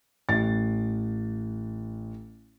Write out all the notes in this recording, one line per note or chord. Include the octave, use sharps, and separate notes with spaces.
A1 A6